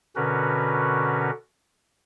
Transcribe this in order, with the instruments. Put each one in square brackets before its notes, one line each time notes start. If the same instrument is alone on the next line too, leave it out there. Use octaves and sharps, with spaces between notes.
[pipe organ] B2 D3 C#4 F#4 A#4 B4